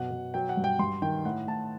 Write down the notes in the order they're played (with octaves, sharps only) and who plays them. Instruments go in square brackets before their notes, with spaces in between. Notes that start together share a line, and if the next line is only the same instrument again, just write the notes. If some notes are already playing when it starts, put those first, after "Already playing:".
Already playing: [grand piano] F#2 B2 F#5
B2
F#3 G5
F#5
G2
G5
G2 C6
D#3 G5
A2 F#5
A2 A5